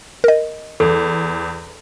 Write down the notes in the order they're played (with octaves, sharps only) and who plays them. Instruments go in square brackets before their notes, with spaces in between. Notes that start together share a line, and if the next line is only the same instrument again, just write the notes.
[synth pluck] A#4 D#5
[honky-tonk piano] E2 [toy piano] A4